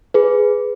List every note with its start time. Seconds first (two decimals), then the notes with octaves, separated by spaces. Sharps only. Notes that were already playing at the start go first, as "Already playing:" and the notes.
0.14 G#4 B4